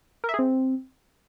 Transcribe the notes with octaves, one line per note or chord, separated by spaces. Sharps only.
A#4
E5
G#4
C4